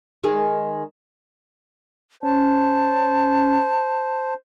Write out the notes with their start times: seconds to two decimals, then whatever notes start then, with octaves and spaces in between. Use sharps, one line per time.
0.24 D#3 G#3 G#4
2.23 C#4 C5 A5